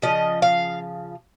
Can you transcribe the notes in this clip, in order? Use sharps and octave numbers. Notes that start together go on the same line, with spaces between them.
C#3 F3 D#5
F5